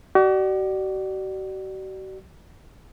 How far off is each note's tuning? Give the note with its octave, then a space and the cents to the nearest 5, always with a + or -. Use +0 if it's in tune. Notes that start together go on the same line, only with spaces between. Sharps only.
F#4 +45 D5 +25